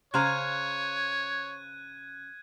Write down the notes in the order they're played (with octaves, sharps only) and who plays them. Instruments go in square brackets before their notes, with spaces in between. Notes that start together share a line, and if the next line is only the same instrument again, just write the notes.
[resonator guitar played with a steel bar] C#3 A#5 [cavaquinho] C5 F5 [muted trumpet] C#5 [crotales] F#6 G#6 D#7